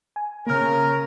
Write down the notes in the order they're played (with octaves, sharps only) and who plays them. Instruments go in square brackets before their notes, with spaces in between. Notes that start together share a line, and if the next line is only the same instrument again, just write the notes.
[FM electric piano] G#5
[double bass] C#3 [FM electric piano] A#3 F6 [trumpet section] A#4